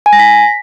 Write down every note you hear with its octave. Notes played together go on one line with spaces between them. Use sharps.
G#5
A#6
B6